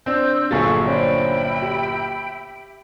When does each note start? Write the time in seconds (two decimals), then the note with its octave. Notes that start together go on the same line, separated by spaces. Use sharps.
0.06 C4 D4 C5 E6 G6
0.51 G1 A#2 F#3 G#4 A4 F5 C#6 A6
0.86 C#4 D4 C5 E5 G5 B5
1.62 G4